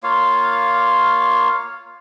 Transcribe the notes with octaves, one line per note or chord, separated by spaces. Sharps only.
A#3 F4 C#5 F5